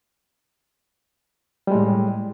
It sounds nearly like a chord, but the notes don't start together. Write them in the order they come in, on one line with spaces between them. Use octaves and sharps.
G3 G#3 A2